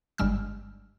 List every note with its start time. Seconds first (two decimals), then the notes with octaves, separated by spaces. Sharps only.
0.18 G1 G2 G3 G#3 E6 F6